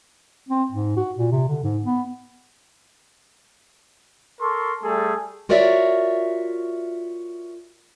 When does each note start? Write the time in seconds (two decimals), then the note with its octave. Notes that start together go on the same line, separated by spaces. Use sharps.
0.49 C4
0.71 G#2
0.97 F#4
1.17 A#2
1.32 C3
1.48 D3
1.64 G#2
1.85 B3
4.41 A4 A#4 C6 C#6
4.83 G3 A3 G#4 A4
5.49 F4 F#4 A#4 C#5 D5 E5